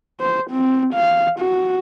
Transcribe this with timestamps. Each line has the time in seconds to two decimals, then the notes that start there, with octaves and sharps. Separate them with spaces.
0.20 C5
0.51 C4
0.94 F5
1.39 F#4